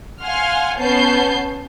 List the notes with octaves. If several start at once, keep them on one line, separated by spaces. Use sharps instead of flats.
F5 F#5 G#5 C6 F6
B3 C#4 A5 G6 C7